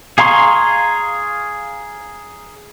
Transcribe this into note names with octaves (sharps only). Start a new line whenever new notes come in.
G#4 F5 A#5 C6 C#6